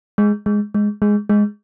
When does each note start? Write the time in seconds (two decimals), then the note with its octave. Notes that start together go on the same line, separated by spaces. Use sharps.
0.18 G#3
0.46 G#3
0.74 G#3
1.02 G#3
1.29 G#3